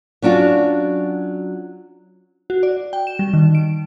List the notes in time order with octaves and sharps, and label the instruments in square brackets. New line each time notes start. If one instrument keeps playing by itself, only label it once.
[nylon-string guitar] F#3 C#4 D4 F4 F#4
[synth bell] F#4
D5
G5
E7
G3
D#3
D7